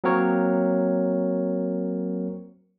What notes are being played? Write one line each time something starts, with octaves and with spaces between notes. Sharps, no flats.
F#3 A#3 C4 A#4 C#5